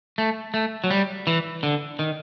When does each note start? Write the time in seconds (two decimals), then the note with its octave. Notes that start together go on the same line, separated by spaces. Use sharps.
0.18 A3
0.54 A3
0.84 F#3
0.91 G3
1.27 E3
1.63 D3
1.99 D#3